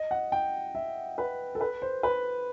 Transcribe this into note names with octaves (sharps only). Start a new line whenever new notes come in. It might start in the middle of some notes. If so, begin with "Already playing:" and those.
Already playing: D#5
F#5
G5
E5
B4
A4
B4
C5
B4